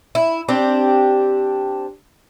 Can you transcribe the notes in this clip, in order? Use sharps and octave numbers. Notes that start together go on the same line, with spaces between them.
E4
C4 D4 G4